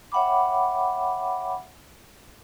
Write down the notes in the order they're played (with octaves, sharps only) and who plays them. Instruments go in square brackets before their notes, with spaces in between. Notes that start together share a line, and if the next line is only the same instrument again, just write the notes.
[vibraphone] C#5 E5 F#5 G5 B5 D6